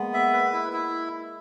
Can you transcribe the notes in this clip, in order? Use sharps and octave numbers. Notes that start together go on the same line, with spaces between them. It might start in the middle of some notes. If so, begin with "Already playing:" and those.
Already playing: G#3 A#3 B3
E5
B4
E4
E4